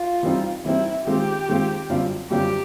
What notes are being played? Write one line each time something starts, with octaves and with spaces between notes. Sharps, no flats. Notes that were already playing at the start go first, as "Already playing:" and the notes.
Already playing: F4
E3 G3 C4 D#4
E3 G3 C4 D#4 E4
D#3 G#3 C4 F4 G4
D#3 G#3 C4 F4
F#2 D3 G3 C4 F4
F#2 D3 G3 C4 F4 G4